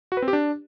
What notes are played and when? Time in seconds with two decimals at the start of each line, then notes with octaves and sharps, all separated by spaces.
0.12 F#4
0.17 B4
0.22 C4
0.28 G4
0.33 D4